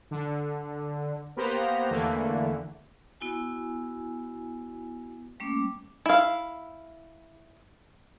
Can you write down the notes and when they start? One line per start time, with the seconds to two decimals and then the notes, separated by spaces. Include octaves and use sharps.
0.11 D3
1.36 A#3 B3 G4 C5 A#5
1.91 E2 D3 E3 A3 A#3
3.21 B3 E4 F#4 G#5
5.40 G3 A3 A#3 C#4 D6
6.06 E4 F5